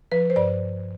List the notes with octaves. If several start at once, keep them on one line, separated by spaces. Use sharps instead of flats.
F3 B4
C5
G2 D5